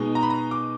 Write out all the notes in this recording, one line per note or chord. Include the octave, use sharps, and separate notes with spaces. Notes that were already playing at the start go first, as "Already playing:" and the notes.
Already playing: B2 G#3 D#4
A#5
B5
A#5
D6